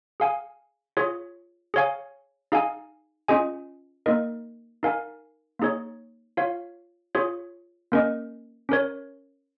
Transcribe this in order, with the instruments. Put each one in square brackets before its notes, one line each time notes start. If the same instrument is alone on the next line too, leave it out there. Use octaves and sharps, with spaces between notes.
[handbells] G#4 F5 G#5
F4 G#4 C#5
G#4 C#5 F5 G#5
D#4 G#4 F5 G#5
C#4 F4 G#4 D#5 G#5
A#3 D#4 A#4 D#5
D#4 A#4 F5 G#5
A#3 D#4 G#4 C#5
F4 C#5 F5
F4 G#4 C#5
A#3 C#4 A#4 D#5
C#4 A#4 C#5